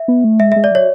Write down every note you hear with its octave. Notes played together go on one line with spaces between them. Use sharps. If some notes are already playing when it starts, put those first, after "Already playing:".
Already playing: E5
B3
A3
G#3 E5
G#3 E5
D5
F#3 C#5